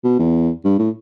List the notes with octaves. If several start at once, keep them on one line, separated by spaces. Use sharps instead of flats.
B2
E2
G2
A2